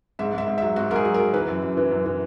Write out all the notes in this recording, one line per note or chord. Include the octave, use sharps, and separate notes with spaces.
G#2 E5
G#2 E5
G#2
E5
F#3
G#2 F#4
G#2 G#4 A#4
F#3
A#4
F#3
E3 B4
F#2
F#2
E3
F#2
E3